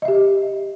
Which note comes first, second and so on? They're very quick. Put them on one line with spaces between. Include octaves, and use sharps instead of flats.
D#5 E5 G4